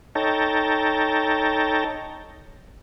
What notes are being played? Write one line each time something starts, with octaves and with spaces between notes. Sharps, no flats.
D#4 A4 C#5 G5 A5 A#5